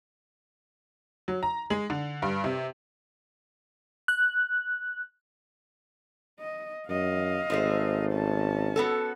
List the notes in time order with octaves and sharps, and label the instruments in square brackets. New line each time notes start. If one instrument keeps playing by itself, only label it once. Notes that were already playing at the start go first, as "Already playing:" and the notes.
[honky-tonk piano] F#3
A#5
G#3
D3
G2
C3
[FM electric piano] F#6
[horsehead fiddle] D#5
[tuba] F#2 [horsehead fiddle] D#5 F5
[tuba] G#1 [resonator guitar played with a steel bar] G#3 A3 C5
[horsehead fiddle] C#4 A5
[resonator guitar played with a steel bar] B3 F#4 A4